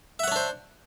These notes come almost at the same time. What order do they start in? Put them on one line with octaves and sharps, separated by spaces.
E5 F#5 C#5 D4 C5